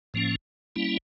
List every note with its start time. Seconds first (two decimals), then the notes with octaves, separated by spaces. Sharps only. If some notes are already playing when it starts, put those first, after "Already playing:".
0.14 A2 F3 A#3 C#4
0.76 G3 A#3 C#4 E4